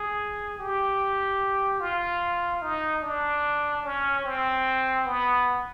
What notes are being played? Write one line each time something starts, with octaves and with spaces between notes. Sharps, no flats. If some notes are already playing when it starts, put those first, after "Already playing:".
Already playing: G#4
G4
F4
D#4
D4
C#4
C4
B3